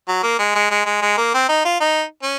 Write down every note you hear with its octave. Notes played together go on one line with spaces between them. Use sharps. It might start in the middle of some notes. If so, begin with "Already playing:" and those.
F#3
A#3
G#3
G#3
G#3
G#3
G#3
A#3
C4
D#4
F4
D#4
C#4